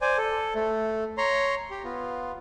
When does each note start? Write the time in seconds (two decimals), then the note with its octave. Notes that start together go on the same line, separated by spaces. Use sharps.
0.02 C5 D5 G#5
0.18 A4
0.55 A3
1.18 C#5 A#5 C6
1.70 G4
1.84 B3 F4